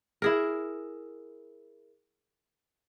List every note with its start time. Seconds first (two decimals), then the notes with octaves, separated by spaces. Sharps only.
0.22 E4 G#4 A#4